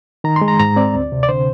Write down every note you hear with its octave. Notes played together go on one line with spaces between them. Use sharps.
D#3 A#5
C6
G#3
A#5
G#2 A#5
C4 D5
D2
C3
D5
D3 C5